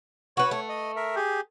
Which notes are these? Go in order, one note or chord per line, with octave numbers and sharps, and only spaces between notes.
F#4 B4 C#5
A3
D#5
A#4 E5
G4 G#4